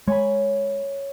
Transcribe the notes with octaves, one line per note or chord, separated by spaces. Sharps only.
G#3 C#5 G#5 B5